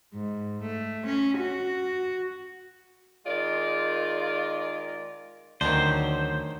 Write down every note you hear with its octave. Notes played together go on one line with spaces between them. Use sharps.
G#2
A3
C#4
F#4
D#3 G#3 F4 D5
D2 D3 D#3 F#3 C#4 D4 C5